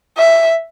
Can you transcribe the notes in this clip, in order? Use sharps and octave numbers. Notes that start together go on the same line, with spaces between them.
E5